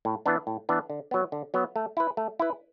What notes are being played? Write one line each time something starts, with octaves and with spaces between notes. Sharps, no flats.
A2
E3 B3 D4
A2
E3 B3 D4
D3
F#3 B3
D3
F#3 B3
A3
E4 B4
A3
E4 B4